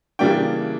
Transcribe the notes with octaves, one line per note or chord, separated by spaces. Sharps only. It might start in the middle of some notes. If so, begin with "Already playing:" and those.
C#3 E3 G3 A#3 D4 G5